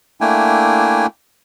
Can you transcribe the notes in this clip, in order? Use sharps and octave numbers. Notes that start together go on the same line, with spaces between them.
A3 A#3 D4 E4 G5 G#5